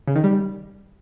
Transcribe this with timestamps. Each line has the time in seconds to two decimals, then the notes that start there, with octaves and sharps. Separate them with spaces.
0.08 C#3
0.16 D#3
0.24 G3